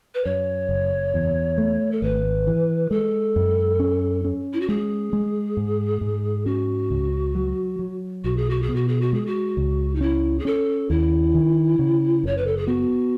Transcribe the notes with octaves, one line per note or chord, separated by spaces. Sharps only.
B4
F#2 C#5
F#1
E2
A3
A4
G#1 B4
E3
G#3 A4
F#2
C#4
C#4
E4
F#4
G#3 G#4
G#3
G#2
G#2
C#4 F#4
C#2
F#3
F#3
B1 F#4
G#4
F#4
G#4
B2
F#4
G#4
F#4
G#3 G#4
F#4
C#2
D#4
C#4 E4
G#4
C#4 A4
D#2 E4
D#3
C#3
F#1 C#5
B4
A4
G#4
B3 F#4